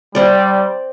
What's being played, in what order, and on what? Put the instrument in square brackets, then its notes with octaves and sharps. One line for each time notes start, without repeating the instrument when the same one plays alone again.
[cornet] G3 [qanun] C4 D5